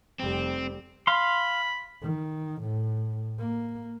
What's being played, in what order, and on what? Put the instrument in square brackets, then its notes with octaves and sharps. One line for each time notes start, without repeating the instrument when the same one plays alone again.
[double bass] F1 G3 [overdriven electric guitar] C4
[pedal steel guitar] F5 C6 [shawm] B5
[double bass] D#3
A2
A#3